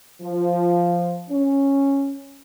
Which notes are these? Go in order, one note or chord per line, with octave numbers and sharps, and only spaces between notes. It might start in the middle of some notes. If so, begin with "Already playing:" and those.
F3
C#4